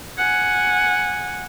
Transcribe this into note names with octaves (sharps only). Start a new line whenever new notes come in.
F#5 G#5